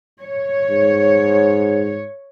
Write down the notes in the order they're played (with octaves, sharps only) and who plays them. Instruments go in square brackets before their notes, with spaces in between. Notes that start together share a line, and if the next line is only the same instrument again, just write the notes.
[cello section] C#5
[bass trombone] G#2